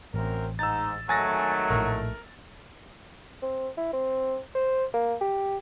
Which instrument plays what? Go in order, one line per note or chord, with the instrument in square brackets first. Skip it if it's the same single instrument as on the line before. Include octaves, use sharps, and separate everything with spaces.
[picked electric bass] A1 [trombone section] F#2 C4 A#4
[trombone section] G#2 [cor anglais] D#4 [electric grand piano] E6 A6
[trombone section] G#1 D#3 A3 [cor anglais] F#3 [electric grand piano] G#5 A6 A#6
[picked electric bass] A#1 A2 [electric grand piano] A#4
[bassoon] C4
E4
C4
C5
A#3
G4